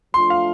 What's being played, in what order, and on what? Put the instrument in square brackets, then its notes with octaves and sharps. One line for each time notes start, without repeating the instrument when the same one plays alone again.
[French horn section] F3 A3 D4 F4 [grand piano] C6
[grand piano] F5